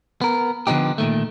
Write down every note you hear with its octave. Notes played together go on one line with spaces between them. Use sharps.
B3 A#4
D3 F3 B3 D#4 G4
A#2 D#3 A3